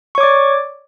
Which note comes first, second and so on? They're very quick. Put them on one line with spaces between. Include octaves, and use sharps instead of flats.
C#6 C#5 D6 D5